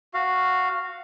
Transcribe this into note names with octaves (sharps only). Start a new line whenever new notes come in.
F#4 F5